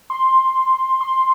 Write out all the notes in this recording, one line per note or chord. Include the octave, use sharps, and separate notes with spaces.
C6
C6